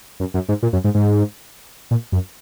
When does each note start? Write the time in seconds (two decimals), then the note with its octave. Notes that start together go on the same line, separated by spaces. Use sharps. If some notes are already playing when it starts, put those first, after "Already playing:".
0.20 F#2
0.34 F#2
0.49 G#2
0.63 A#2
0.73 F#2
0.84 G#2
0.94 G#2
1.91 A#2
2.12 F#2